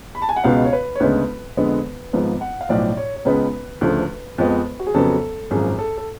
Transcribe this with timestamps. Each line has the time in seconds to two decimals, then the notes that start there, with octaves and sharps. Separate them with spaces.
0.15 B5
0.22 A5
0.29 G#5
0.36 F#5
0.44 C#2 B2 G#3 B3 F5
0.65 C#5
0.73 B4
0.95 C#5
1.00 D2 C#3 G#3 B3 B4
1.57 F2 D3 G#3 B3
2.13 G#1 G#2 F3 B3
2.41 F#5
2.61 F5
2.69 B1 A2 F3 D5
2.97 C#5
3.16 C#5
3.25 C#2 C#3 G#3 B3 B4
3.81 D2 C#3 F3 A3
4.38 F2 F3 G#3 B3
4.80 F#4
4.87 G#4
4.94 F2 C#3 F#3 B3 A4
5.51 G#1 F#2 F3 G#4
5.78 A4
5.98 A4